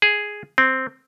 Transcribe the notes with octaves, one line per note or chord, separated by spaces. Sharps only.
G#4
C4